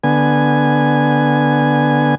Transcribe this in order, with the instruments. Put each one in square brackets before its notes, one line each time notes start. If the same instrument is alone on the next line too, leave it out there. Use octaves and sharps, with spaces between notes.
[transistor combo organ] D3 B3 G#5